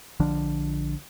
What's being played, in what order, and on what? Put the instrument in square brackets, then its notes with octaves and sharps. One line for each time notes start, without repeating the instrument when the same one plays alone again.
[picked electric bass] A#1 D3 F3 D4